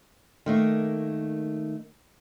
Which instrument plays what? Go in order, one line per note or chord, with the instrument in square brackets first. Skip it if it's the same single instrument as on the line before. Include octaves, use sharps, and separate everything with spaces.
[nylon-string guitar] D#3 A3 A#3